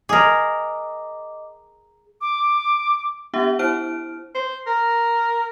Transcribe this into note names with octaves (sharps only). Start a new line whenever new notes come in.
G#4 A#4 D#5 D6
D6
B3 D4 G4 E5 F#5
E4 C5 F6 D7
C5
A#4